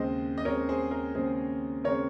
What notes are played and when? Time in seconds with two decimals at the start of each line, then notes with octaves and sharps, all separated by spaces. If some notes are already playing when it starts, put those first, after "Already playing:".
Already playing: D#2 C#3 G#3 C4 C5 D#5
0.38 D#5
0.45 D#2 C#3 G#3 C4 A#4 C#5
0.69 G#4 C5
0.91 A#4
1.15 D#2 C#3 G#3 C4 G#4 C5
1.84 C#3 G#3 C4 A#4 C#5